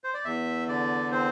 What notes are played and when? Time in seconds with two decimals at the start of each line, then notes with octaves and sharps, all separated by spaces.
0.04 C5
0.14 D5
0.25 E2 E5
0.68 D3 D5
1.12 C4 C5